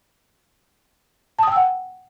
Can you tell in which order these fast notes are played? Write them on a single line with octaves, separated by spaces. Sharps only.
A5 D#6 G5 E6 F#5